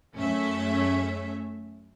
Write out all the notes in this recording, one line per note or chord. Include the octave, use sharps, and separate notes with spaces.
F#2 A3 C#4 E5